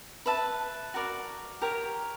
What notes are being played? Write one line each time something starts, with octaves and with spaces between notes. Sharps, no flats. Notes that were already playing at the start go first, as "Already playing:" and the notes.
B4 E5 A5
F#4 A#4 D5
G4 A#4 C#5